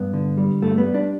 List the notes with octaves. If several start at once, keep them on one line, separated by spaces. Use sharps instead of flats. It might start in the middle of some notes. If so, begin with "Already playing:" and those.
Already playing: G2 B3
D3
G3
G2 A3
B3
G3
D4